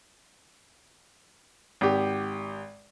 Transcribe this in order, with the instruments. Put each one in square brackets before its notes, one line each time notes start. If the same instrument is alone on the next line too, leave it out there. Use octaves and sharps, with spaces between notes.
[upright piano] G#1 G4